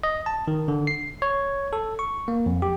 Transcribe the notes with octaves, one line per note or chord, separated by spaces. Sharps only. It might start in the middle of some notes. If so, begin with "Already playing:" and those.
D#5
A5
D#3
D3
C7
C#5
A4
C#6
A#3
F2
G4